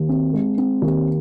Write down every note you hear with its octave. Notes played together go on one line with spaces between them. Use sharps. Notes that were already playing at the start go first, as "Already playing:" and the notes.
Already playing: D#2
C4
G#3
C4
D#2